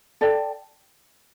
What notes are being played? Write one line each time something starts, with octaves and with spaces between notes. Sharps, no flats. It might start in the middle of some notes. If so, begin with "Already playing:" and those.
A4 D5 G5